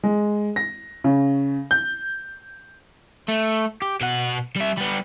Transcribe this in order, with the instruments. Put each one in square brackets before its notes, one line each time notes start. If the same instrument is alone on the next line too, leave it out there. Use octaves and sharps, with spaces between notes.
[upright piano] G#3
A#6
C#3
G6
[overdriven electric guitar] A3
G4
B2 F#5
G3 E5
G3 B3